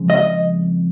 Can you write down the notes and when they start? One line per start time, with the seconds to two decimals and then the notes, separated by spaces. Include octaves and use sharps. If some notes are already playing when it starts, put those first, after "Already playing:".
Already playing: F2 C#3 G#3
0.10 D#5